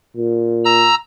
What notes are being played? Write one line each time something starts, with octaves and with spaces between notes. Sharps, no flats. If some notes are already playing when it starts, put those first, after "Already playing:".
A#2
A#5 E6